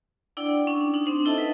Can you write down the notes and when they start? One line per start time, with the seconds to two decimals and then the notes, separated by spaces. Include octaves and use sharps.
0.37 D4 E4 D5 F#5 G5
0.67 C#4 D4
0.94 D4 D#4
1.06 C4 D4 C5
1.25 D#4 E4 A4 D#5 E5 A5
1.38 A4 B4 E5 F#5